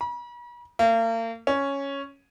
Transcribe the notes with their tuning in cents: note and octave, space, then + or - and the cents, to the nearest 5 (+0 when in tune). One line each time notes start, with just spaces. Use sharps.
B5 -45
A#3 -40
C#4 +0